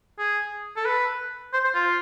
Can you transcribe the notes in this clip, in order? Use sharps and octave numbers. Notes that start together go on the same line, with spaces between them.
G#4
A4
B4
C5
C5
F4